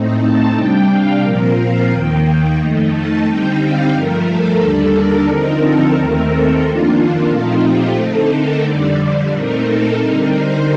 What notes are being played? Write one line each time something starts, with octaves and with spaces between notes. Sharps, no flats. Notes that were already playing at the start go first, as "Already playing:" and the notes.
Already playing: A2 A3 C4 D#4
A5
C3 G3 D4 G5
F5
A#2 F3 C4 A#4
F5
D#2 D#3 A#3 G5
G5
F2 D#3 A3 D#4
A5
D3 G3 C4 D#4 G5
F5
G2 F3 A3 A#4
A4
D#2 D3 G3 D4
A#4
D3 F3 C4 D#4
A4
D#2 D#3 A3 C4 A#4
A4
F2 D#3 A#3 D4 F4
A#2 F3 A3 C4 D#4
G4
D3 A3 C4 D#4 A4
A#4
F2 D3 G3 D5
D5
A#2 A3 C4 D#4 A#4
A4
D3 G3 C4 D#4 A#4
C5